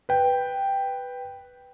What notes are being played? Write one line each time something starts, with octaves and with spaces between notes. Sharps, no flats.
B4 G5